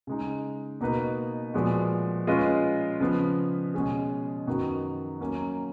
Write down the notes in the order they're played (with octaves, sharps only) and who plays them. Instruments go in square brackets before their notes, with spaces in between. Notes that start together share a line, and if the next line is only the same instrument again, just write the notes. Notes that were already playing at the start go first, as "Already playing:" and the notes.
[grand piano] C#3 G#3 D#4
B2 A#3 D#4 F#4 B4
A#2 F3 G#3 B3 F#4
G#3 C#4 F4 B4 D#5
C#3 F3 B3
B2 G#3 C#4 G#4
F#2 D#3 F#3 B3 F#4
F#3 A#3 C#4